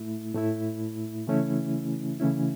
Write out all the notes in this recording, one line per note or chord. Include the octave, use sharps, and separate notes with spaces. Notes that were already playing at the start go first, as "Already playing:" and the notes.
Already playing: A2 A3 E4
A2 A3 E4
C#3 E3 A3 C#4 E4
C#3 E3 A3 C#4 E4